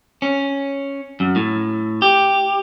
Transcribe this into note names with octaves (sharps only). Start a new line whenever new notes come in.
C#4
F#2
A2
G4